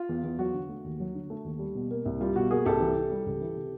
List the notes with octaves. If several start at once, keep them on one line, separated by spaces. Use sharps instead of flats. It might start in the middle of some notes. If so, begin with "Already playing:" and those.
Already playing: F4
E2
E2
F#3 F#4
D3
A3
D#2
F#3
D3
A3
D#2
G3
B2
A#3
C2
G3 F4
B2 F#4
A#3 F#4 G#4
C2 G4 A4
E3
C3
G3
C#2
E3
C3